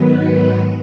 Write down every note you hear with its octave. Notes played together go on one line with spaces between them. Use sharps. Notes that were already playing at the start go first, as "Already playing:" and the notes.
Already playing: G#2 D#3 F#3 B3 B4